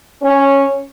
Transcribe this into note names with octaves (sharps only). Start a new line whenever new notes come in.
C#4